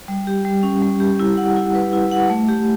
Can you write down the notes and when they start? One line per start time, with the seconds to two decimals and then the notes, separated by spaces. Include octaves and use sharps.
0.08 G3
0.27 G4
0.45 G3
0.63 C#4
0.82 G3
1.00 G4
1.19 E4
1.37 F#5
1.56 E4
1.75 B4
1.93 E4
2.11 F#5
2.30 A3
2.48 G4